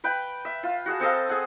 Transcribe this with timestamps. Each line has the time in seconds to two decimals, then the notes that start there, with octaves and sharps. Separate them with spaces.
0.04 B4 G5 B5
0.45 E5
0.63 F4
0.86 F#4 G#4 A5
1.00 C4 A4 D#5 F5
1.29 G#4 F#5